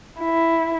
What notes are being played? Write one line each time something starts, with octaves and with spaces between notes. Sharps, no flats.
E4